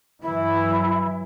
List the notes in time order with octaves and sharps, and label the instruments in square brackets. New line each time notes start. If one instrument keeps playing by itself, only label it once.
[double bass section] G2 E3 F#3 [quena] E4